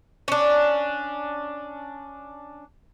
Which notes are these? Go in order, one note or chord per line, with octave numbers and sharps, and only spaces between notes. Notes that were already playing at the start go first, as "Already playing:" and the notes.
C#4 D4